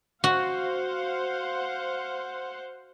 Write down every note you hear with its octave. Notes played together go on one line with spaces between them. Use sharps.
F#4 C5 F5 F#5